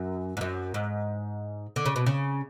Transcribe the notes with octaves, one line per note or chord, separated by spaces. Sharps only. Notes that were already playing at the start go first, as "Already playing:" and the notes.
Already playing: F#2
G#2
F#2
G#2
D3
C#3
B2
C#3